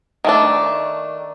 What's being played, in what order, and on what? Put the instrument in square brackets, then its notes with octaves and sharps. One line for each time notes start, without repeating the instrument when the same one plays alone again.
[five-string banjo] D#3 A3 D4